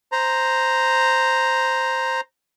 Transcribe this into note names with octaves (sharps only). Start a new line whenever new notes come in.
C5 A#5